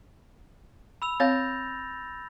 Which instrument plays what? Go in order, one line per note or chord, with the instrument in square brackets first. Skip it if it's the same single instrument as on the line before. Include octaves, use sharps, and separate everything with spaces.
[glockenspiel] B5 E6 F7
[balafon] C4 C#5 F5 [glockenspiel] G6 A6 A#6